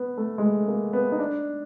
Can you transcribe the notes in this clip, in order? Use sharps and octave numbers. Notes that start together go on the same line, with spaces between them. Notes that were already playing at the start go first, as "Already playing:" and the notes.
Already playing: B3
A3
G#3
A3
A#3
B3
D#4
D4